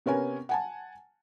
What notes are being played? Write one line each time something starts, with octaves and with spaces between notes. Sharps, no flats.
C3 B3 C#4 A#4 G#5
F#5 G#5 A5